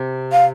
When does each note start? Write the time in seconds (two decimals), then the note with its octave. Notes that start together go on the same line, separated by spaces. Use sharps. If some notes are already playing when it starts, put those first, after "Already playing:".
Already playing: C3
0.32 F5